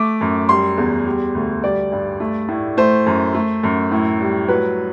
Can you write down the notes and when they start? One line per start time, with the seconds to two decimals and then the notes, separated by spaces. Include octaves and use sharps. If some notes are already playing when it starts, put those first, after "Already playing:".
Already playing: A3 D6
0.21 F#2
0.49 G3 C6
0.78 E2
1.06 G3
1.35 D2
1.64 G3 D5
1.92 G2
2.20 A3
2.49 A2
2.77 A3 C5
3.06 F#2
3.34 A3
3.63 F#2
3.92 A2
4.20 G3
4.48 F#3 B4